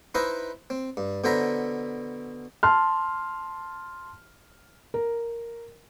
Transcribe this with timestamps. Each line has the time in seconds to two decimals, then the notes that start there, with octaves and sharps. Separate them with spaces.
0.15 D#4 E4 B4 C5 D#5 E5
0.70 C4
0.97 G2
1.24 B2 D3 C5 E5 A#5 B5
2.63 A5 C6 F6
4.94 A#4